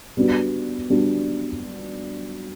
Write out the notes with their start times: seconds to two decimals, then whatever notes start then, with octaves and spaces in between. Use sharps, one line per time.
0.17 G3 B3 D4 F#4
0.90 G3 B3 D4 F#4